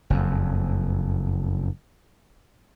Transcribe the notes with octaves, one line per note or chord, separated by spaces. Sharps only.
F#1 F2